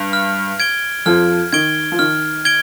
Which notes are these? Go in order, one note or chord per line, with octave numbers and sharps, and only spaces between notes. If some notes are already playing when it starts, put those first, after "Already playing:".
Already playing: G2
F6
G#6 D7 G7
F2 F3 F6
D#3 G#6 D7 G7
F3
D#3 F6
G#6 D7 G7